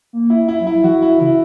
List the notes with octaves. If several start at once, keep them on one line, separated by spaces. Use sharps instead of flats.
A#3
E4
E4
F#3
E4
F#3
E3 F#4
E4
C#3 E4